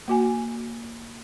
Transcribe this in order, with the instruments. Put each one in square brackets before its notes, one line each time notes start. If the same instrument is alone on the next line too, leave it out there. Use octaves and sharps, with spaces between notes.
[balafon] A#3 F#4 G#5